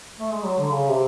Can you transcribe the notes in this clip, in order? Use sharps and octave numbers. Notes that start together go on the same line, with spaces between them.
A3
G#3
F#3
D3
C#3
C3